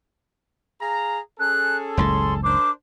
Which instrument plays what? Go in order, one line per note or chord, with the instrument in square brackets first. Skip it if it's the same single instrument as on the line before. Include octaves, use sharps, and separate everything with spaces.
[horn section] G#4 F5 A#5
[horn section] C#4 G#4 A4 [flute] F#6
[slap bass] F#1 C#2 A2 [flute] C6
[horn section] D4 A#4 C5 [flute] D6